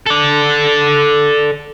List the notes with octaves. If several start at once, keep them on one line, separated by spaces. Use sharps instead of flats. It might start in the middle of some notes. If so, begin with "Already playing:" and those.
A4 D5